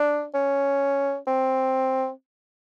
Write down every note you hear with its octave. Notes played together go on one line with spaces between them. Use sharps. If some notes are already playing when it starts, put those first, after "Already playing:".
Already playing: D4
C#4
C4